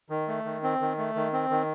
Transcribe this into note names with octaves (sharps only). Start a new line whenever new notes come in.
D#3
A3
D#3
C4
D#3
A3
D#3
C4
D#3